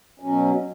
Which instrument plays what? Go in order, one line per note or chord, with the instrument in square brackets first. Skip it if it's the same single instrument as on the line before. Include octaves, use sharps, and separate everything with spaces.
[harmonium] B2 F#3 C#4